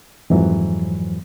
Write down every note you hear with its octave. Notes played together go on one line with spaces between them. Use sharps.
F2 G#2 E3 F#3